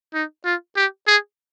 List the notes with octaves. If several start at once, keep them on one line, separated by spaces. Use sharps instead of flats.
D#4
F4
G4
G#4